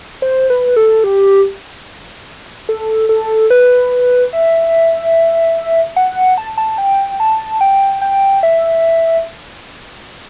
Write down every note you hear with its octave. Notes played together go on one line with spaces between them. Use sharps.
C5
B4
A4
G4
A4
A4
B4
E5
F#5
A5
A5
G5
A5
G5
G5
E5